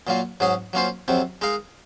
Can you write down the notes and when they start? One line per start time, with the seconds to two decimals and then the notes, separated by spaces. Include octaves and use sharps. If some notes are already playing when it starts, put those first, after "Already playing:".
0.07 A#2 F#3 A#3 F4
0.40 G#2 F#3 C#4 G#4
0.73 F#3 A#3 C#4 F4 C5
1.08 F2 C3 F#3 C4
1.41 G#3 D#4 A#4 F5